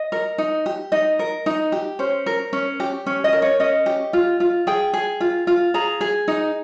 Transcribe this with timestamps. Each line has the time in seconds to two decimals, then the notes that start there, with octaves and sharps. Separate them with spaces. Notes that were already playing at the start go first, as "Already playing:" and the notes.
Already playing: D#5
0.12 A#4
0.38 D#4
0.66 G4
0.92 D#4 D#5
1.19 A#4
1.46 D#4
1.72 G4
1.99 C#4 C5
2.26 A#4
2.53 C#4
2.80 G4
3.06 C#4
3.24 D#5
3.33 A#4
3.42 C#5
3.60 C#4 D#5
3.86 G4
4.13 F4
4.40 F4
4.67 G#4 G5
4.93 G#4
5.20 F4
5.47 F4
5.74 G#4 A#5
6.01 G#4
6.28 D#4